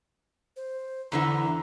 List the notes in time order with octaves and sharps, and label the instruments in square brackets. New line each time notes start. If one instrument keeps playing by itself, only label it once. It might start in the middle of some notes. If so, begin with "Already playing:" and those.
[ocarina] C5
[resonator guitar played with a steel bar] E2 D3 E3 [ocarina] A#5